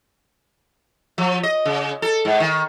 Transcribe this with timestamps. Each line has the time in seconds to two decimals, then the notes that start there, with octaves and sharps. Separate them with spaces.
1.18 F3
1.43 D#5
1.66 C#3
2.02 A4
2.25 G#2
2.40 D#3